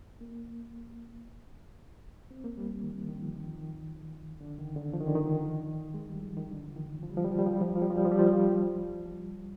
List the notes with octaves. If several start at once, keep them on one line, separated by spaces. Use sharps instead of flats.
A#3
C4
A#3
G3
D#3
D3
D#3
F3
D#3
F3
D#3
D3
D#3
D3
F3
D#3
D3
D#3
G#3
G3
F3
D#3
D3
F3
D#3
F3
G3
F3
G3
F3
G3
F3
G3
F3
G3
F3
G3
F3
G3
F3
G3
F3
G3
F3
F3
G3